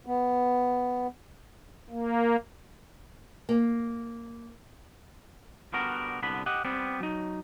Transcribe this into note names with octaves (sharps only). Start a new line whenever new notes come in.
B3
A#3
A#3
D3 G3 B3 F#4 A#4
C2 D3 B3 B5
G4 D#5 F#5
G3 B3 C4
F#3 D#4